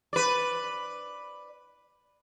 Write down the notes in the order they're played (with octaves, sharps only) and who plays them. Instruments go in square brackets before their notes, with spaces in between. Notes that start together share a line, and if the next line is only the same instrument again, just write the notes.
[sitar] B4 D5